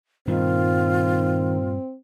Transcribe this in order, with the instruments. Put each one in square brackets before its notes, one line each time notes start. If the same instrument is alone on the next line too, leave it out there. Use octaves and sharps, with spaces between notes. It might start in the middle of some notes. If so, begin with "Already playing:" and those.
[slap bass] G2 A#2 G3 [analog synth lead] D#3 [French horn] C4 [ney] F4